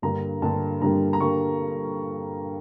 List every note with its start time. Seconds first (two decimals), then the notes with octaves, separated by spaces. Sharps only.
0.02 G2 D3 G3 A#3 A#5
0.42 G2 D3 G3 A#3 A5
0.82 G2 D3 G3 A#3 A#5
1.13 A#5
1.20 D3 G3 A#3 C#6